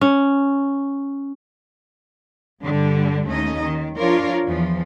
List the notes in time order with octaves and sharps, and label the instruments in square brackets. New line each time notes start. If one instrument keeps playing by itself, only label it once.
[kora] C#4
[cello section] G2 D3 G3
D#2 A3 C#4 D#4 D#5
D#3
F3 D4 F4 A#4 C#5 D5
E2 E3 F3